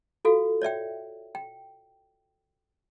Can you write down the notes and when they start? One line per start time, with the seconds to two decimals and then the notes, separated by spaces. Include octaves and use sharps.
0.25 F4 F#4 A4 F5
0.62 C#5 D5 E5 G5
1.35 G5